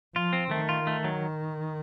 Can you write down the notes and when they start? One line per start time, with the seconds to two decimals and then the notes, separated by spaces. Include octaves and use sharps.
0.15 F3 F4
0.33 C4
0.51 D#3 A3
0.69 F4
0.87 A3
1.04 F#3